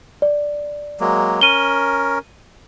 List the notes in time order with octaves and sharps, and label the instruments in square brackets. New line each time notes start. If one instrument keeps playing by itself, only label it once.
[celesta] D5
[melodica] F#3 G#3 A#3
[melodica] C#4 A#4 [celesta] D#7 G7